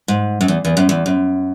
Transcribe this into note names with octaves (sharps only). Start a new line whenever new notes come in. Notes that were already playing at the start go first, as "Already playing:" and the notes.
G#2
F#2
E2
E2
F#2
E2
F#2